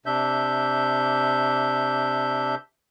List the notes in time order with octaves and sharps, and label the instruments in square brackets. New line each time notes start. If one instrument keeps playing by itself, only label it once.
[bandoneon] C3 D4 E5 G6